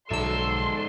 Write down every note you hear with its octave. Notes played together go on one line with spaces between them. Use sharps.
B1 G#2 D3 D5 E5 A5 C6 E6